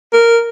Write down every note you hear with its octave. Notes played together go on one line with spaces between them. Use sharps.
A#4